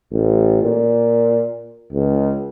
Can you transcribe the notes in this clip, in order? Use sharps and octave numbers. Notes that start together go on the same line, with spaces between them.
A1
A#2
C#2